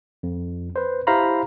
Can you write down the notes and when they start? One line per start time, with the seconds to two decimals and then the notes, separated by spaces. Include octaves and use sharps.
0.23 F2
0.76 B4 C5
1.07 E4 G4 C5 F5 A#5 B5